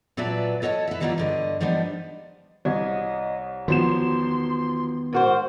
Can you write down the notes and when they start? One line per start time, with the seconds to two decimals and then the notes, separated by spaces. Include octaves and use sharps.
0.17 A#2 F#3 B4 D5 E5 A5
0.62 A4 C#5 D#5 G5 A5
0.87 B4 E5
1.00 D#3 E3 G3 A#3 B3 F4
1.18 G2 D3 D#5
1.60 F3 G3 B3 D4 D#4
2.65 C2 C#5 D#5
3.68 E1 D#3 F3 B3 C6 E7
5.13 G#2 F#4 A#4 C5